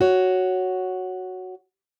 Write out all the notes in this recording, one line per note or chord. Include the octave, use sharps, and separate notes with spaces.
F#4 C#5